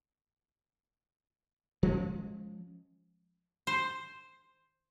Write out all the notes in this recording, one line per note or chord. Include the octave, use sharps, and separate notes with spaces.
F3 G#3 C#4
C5